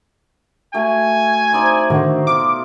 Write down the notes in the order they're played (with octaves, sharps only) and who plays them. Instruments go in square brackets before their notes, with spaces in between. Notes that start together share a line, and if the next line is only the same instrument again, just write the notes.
[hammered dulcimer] A3 F#4 [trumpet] G#5
[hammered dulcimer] C4 D#4 D5
[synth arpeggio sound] A2 D3 D#3 [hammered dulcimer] F#4 C5
[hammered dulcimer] B2 F4 [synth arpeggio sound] D6